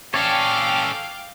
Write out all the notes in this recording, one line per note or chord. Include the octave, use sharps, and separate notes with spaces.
C#4 A4 C#5 D5 F5 G5 D6